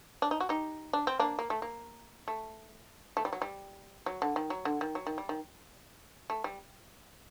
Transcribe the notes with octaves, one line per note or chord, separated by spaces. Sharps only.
D4
D#4
F#4
D#4 G4
D4
C4
A#3 D4
A#3
A3
A#3
A3
A3
G3
F#3
G3
F#3
D3
D#3
F#3
D3
D#3
F#3
D#3
G3
D#3
A3
G3